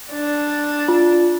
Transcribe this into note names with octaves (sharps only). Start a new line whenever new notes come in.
D4
F4